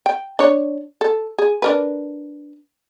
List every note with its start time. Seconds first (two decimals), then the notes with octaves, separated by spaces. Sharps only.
0.06 G5
0.39 D4 C#5
1.01 A4
1.38 G#4
1.62 D4 A#4 B4